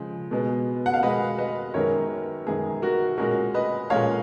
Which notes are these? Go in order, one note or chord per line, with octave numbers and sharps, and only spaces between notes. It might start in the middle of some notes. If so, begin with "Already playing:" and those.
Already playing: C#3 F3 G#3
B2 G#3 B3
F#5
F5
B2 G#3 B3 B4 D#5
B4 D#5
F#2 D#3 G#3 B3 A#4 C#5
F#2 D#3 G#3 B3 G#4
F#4 A#4
A#2 G#3 C#4 F#4 A#4
B4 D#5
A#2 G#3 C#4 C#5 F5